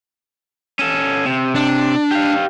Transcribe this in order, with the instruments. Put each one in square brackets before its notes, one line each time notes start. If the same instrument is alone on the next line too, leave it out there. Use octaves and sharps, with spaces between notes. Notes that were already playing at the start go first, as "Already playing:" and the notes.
[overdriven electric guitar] C#4 A4
C3
[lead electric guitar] D4
[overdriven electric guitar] G4 F5